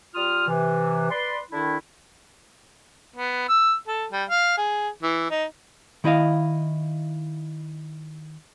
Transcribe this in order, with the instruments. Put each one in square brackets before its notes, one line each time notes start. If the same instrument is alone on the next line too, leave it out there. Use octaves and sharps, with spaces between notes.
[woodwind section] G3 F4 D#6 F6
C3 E3
B4 D5 C6
D3 D#3 D4 E4
[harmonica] B3
E6
A4
G3
F5
G#4
E3
D#4
[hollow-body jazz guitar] D#3 E4 D#5 F5